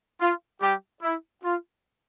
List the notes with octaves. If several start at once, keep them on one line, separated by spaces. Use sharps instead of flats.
F4
G3 G4
E4
F4